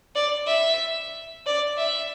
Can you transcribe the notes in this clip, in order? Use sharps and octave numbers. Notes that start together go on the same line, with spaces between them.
D5
E5
D5
E5